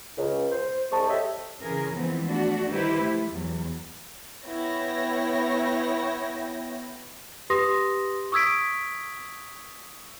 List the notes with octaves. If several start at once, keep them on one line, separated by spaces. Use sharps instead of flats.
C#2
C5
C2 C3 G#3 C5 A5 C#6
G4 A4 C#5 D#5 E5
C#3 E3 G#4 A#4
E3 F3 G#3 B3 C4
A3 D4 F#4
D#3 G3 E4 G4 B4 C5
F3 A3
E2 F#3
B3 E4 C#5 G5 A#6
G4 B4 C6 D#6 A#6
C#6 D#6 E6 G#6 B6 D7